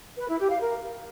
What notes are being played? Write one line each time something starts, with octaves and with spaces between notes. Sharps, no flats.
B4
E4
G4
F5
A#4